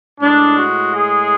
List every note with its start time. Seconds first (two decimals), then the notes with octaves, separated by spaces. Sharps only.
0.20 A2 G#3 D4
0.58 F#4
0.95 G#4